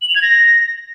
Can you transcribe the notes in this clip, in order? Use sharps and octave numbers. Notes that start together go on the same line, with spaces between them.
F#7
F7
G#6
A#6